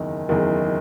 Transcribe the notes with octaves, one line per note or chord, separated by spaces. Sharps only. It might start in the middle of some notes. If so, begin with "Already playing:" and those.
Already playing: F#1 E2 D#3
F#1 E2 D#3